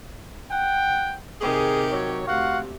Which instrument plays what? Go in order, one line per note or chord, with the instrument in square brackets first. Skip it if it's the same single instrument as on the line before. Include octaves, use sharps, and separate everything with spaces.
[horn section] F#5 G5
[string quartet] C3 D#3 G4 [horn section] G#4
[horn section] F#3 C#5
[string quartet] D2 C3 [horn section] F#4 F5 F#5